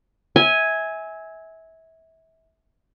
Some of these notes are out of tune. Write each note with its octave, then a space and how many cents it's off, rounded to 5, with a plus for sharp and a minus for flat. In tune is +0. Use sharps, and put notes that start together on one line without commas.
E5 -25 G#5 +0